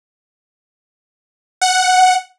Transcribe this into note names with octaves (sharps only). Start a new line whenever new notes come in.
F#5